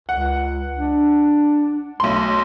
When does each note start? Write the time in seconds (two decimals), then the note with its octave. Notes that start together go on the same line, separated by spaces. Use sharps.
0.09 C#2 F#5
0.78 D4
2.00 B1 A3 C6